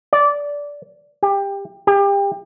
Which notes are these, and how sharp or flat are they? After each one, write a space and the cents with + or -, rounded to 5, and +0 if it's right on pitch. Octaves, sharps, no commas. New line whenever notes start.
D5 -15
G4 +20
G4 +30